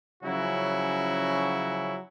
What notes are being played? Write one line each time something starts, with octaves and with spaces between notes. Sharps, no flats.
C#3 F3 F#3 C#4 E4 F#4